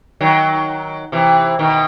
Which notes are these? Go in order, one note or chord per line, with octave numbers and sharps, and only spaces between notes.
D#3 F#3
C3 E3
B2 D#3